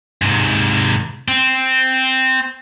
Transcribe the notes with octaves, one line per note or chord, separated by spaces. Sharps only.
G#2 C3
C4